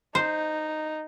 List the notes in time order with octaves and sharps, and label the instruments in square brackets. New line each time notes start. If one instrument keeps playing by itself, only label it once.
[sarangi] D#4 [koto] C5